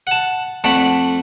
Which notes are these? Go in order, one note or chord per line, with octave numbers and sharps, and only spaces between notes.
F#5 A5
F2 A3 A4 D5 F#5 B5